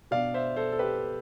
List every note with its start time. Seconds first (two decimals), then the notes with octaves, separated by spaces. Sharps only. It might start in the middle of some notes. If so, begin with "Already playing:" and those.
0.11 B2 B3 D4 D5 F5
0.34 C5 E5
0.56 A4 C5
0.72 A4
0.79 G4 B4